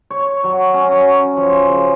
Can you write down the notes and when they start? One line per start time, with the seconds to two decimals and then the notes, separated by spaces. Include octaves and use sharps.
0.10 C#5
0.44 F#3
0.74 C#4
0.92 F#3
1.37 F3
1.67 C#3